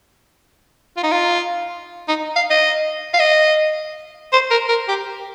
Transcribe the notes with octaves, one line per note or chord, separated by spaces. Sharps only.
F4
D#4
F4
D#4
F5
D#5
F5
D#5
C5
A#4
A#4
G4